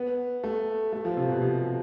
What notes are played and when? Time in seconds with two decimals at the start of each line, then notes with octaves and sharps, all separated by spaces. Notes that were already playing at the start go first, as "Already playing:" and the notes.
Already playing: B3
0.44 A3
0.93 A3
1.05 F3
1.17 C3
1.29 B2
1.42 C3